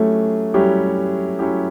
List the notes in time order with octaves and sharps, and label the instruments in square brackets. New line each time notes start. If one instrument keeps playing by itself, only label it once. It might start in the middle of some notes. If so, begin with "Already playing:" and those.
Already playing: [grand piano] F#3 C#4 E4 G4 [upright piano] A3
[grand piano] F#3 C#4 E4 G4 [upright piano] G3
[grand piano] F#3 C#4 E4 G4